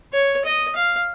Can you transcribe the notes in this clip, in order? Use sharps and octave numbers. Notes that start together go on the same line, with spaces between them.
C#5
D#5
F5